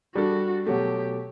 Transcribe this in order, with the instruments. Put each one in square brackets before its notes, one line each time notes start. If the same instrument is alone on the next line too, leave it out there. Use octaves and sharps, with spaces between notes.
[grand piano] G3 D4 A4 [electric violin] F#4
[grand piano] B2 F#3 A3 [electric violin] G4